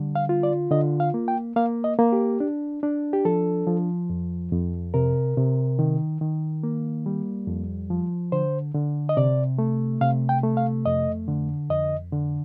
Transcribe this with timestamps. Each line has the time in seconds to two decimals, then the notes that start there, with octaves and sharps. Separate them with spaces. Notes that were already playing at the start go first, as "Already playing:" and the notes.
Already playing: D3 G3
0.15 F5
0.29 F4
0.43 D5
0.71 D3 D#5
1.00 F5
1.14 A#3
1.28 G5
1.56 A#3 F5
1.84 D#5
1.99 A#3
2.12 G4
2.40 D4
2.83 D4
3.13 G4
3.25 F3 A4
3.67 F3
4.10 F2
4.52 F2
4.94 C3 A#4
5.37 C3
5.79 D#3
6.21 D#3
6.63 A#3
7.06 G3
7.47 F2
7.90 F3
8.32 D3 C5
8.75 D3
9.09 D#5
9.17 C3 D5
9.58 A3
10.01 C3 F5
10.29 G5
10.44 A3
10.57 F5
10.86 F2 D#5
11.28 D3
11.70 F2 D#5
12.12 D3